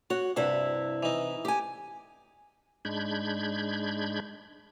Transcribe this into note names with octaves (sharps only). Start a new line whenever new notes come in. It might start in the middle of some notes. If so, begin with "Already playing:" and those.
F#4 C#5
G2 C3 E4 E5
E3 D#4
G4 G#5
G#2 G#3 D4 B5 G6 G#6